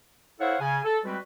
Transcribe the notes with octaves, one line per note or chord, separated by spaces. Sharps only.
E4 A4 C5 C#5 F5 F#5
C#3 G#5
A4
G3 G#3 C4 F#4 B4